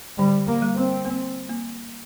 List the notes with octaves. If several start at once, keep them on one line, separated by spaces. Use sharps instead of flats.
D3 G3
A#3
G3
C4
A#3
A#3